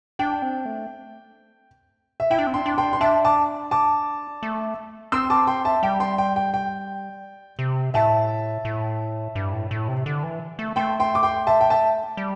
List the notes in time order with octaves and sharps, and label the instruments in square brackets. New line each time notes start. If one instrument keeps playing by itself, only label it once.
[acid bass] D4 [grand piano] G5
[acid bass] C4
A3
[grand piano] E5
[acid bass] E4 [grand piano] G5
[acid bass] D4
C4
[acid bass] D4 [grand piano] G5 C6
[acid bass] D4
[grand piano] G5 C6
C6
[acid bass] D4 [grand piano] E5 A5
[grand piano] A5 D6
A5 D6
[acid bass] A3
[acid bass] C4 [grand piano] C6 E6
[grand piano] A5 D6
G5 C6
E5 A5
[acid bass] G3 [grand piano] G5
[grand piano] G5 C6
G5
G5
G5
[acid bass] C3
[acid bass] A2 [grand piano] E5 A5
[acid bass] A2
G2
A2
A2
C3
D3
E3
A3
[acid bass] A3 [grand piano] G5 C6
[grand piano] G5 C6
D6
G5 C6
E5 A5
G5
E5 A5
[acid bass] G3